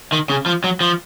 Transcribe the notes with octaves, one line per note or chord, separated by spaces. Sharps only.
D#3
C#3
F3
F#3
F3